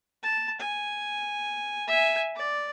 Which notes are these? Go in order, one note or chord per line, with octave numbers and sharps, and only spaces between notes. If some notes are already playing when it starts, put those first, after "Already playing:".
A5
G#5
E5 G#5
D5